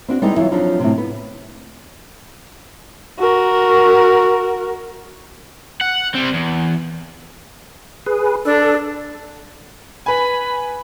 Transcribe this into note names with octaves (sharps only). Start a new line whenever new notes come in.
C4 D4 F#4
G3 G#3 B3 D#4 E4 G#4
E3 F#3 E4 F4
F2 F3 F#3 D4 D#4
A2 C3
B3
F#4 A#4
F#5
G3 C4
E2
G#4 B4
D4 A4
B4 G#5 B5